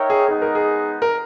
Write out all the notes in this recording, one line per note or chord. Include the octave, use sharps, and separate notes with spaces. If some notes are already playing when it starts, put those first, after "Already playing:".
Already playing: D#4 A#4 C#5 E5 G5
G#4
G#3 B3 D#4 G#4
A#4
G#4
A#4